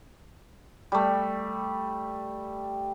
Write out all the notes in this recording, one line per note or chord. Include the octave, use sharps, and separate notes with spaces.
G3 A3